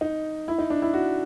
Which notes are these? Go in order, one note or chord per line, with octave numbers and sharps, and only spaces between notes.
D#4
E4
D#4
D4
E4
F#4